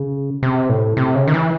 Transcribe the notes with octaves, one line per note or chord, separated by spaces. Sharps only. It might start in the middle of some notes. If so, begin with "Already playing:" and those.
Already playing: C#3
C3
A2
C3
C#3
D#3
E3